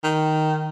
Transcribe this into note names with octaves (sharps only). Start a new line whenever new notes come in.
D#3